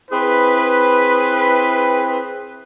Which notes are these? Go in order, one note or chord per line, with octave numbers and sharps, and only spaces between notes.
C4 E4 G#4 B4